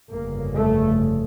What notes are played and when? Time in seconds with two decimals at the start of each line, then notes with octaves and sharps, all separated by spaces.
0.10 G1 F2 C#3 A#3
0.56 A3